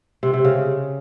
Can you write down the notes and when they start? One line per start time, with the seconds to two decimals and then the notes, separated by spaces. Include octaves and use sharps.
0.23 C3
0.34 C3
0.44 C#3